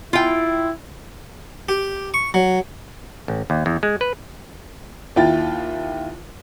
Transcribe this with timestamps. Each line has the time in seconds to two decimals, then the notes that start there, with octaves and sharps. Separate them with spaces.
0.13 E4 F4 G5
1.69 G4
2.14 C#6
2.34 F#3
3.28 A1
3.50 D#2
3.66 E2
3.83 G#3
4.01 B4
5.16 D#2 E4 F4 G5 A6